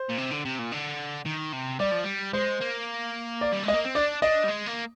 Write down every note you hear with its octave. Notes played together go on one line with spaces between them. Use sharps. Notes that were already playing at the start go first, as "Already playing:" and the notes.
Already playing: C5
A#2
C3
D3
C3
A#2
D3
D#3
C3
G3 D5
F3
G3
G#3 C5
A#3
D5
G3
G#3
D#5
A#3
C4
D4 D5
D4 D#5
G3
G#3
A#3